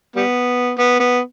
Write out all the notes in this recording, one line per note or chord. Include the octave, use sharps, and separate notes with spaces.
G3 B3
B3
B3